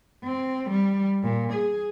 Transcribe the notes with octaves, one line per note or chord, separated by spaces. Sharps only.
C4
G3
A#2
G#4